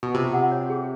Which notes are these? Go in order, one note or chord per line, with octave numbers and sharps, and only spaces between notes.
B2
C3 F4
F#5
C#5
G#4